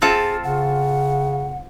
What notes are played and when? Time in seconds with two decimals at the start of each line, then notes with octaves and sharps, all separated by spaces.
0.02 C4 F4 G#4 A4
0.44 C#3 F#5